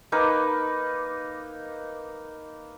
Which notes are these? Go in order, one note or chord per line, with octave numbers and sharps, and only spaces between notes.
A#3 D#4 B4 D6